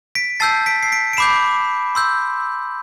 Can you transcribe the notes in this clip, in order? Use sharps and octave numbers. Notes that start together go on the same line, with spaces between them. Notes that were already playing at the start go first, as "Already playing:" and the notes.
B6 D7
A5 E6 G6 A6 C7
B6 D7
C7
B6 D7
D7
B5 D6 G6 C7 E7
C6 E6 G6